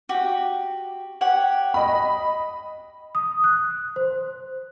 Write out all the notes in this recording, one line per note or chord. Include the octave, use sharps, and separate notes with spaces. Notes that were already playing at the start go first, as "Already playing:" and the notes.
F#4 G4
G4 C#5 F#5
D#5 B5
D#6
F#6
C5